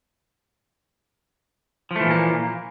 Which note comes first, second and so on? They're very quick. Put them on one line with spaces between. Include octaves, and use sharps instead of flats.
F3 A3 E3 A#2 A#3